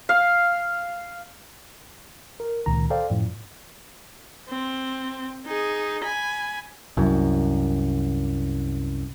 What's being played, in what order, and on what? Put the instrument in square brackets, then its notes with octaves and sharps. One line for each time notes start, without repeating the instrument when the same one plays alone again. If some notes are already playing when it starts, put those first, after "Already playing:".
[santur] F5
[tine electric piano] A#4
C#2 A#2 D#3 A#5
A4 C5 D5 F5 G5
F#2 A2 F3
[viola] C4
D#4 G#4
G#5 B5
[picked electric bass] C2 F#2